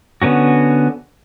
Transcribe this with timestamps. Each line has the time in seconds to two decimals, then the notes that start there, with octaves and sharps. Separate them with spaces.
0.22 D3 B3 C#4 F#4